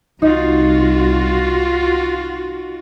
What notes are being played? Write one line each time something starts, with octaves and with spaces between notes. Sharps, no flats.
C2 D#4 F4 F#4